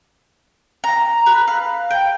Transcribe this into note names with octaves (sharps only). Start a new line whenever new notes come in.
A#5
B4
F5
G5